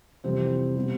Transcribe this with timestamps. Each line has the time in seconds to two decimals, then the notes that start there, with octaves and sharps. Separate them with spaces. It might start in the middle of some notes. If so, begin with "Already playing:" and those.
0.24 F2 C3 E3 G3 C4
0.76 B2 G3